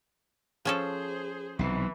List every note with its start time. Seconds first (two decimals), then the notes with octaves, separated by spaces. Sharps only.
0.65 F3 C#4 G#4 A4 C5
1.59 B1 C3 E3